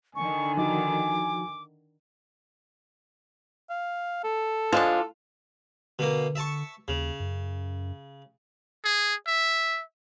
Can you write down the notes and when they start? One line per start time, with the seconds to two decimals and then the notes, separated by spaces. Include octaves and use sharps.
0.15 D3 D#3 G#5 C#6
0.57 F3 D#4 F#4 D6
3.70 F5
4.24 A4
4.72 F3 G#3 D4 F4
5.99 B2 D3 A#3
6.35 E5 A5 C#6
6.88 D#2 C#3
7.20 F#2
8.85 G#4
9.27 E5